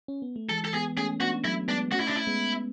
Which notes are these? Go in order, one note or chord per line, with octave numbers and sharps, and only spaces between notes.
C#4
B3
A3
E3 G#3 A4
A4
G#3 B3 G#4
A3 C#4 G#4
B3 D4 F#4
F#3 A3 E4
G#3 B3 D4
A3 C#4 F#4
E4
D4
E4
G#3 B3